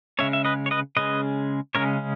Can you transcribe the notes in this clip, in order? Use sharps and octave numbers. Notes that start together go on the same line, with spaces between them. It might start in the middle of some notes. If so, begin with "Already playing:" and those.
C#3 G#3 C#4 C#5 E5
E5
B4 D#5
C#5
B4 D#5
C#3 G#3 C#4 B4 D#5
C#3 G#3 C#4 A#4 C#5